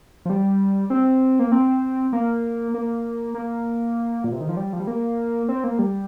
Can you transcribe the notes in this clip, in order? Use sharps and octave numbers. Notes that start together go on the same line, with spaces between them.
F3
G3
C4
A#3
C4
A#3
A#3
A#3
A#2
C3
D#3
F3
G3
F3
G3
A#3
C4
A#3
G3